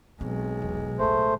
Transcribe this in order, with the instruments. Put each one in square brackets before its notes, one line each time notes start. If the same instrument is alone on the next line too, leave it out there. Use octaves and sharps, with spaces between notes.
[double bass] B1 G#3 [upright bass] C4
[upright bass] E1
[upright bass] A1 D2 [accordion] A3 C5